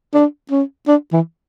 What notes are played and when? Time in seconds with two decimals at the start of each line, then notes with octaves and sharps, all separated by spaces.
0.14 D4
0.51 C#4
0.88 D4
1.13 E3